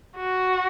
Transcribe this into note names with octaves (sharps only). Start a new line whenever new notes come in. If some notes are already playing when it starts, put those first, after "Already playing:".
F#4